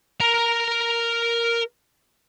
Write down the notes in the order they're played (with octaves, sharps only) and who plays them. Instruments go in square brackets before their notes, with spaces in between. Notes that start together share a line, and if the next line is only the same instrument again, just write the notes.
[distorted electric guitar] A#4 A#5